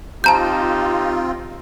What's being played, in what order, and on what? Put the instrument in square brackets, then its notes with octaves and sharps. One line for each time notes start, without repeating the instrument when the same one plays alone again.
[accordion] C4 F4 [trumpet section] D#4 G4 [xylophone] A5 A#5 G6